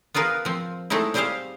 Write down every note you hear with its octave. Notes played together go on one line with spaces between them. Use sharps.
B3 F4 G#4 A#4 B4
F3 C4
G#3 A3 C4 D#4 E4
G3 C4 G4 G#4 C5 F5